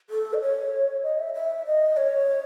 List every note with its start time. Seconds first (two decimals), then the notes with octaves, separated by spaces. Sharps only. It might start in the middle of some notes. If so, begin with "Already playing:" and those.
0.10 A4
0.34 D#5
0.41 C#5
1.03 D#5
1.19 E5
1.34 E5
1.66 D#5
1.97 C#5